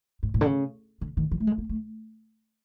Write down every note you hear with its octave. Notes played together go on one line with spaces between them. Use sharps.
G#2
A2
D3
C#3
D3
D#3
E3
A3
G#3
A#3
A3